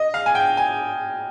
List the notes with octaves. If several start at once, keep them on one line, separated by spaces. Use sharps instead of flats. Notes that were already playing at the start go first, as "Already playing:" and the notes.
Already playing: D#5
F5
G#5
G5
G#5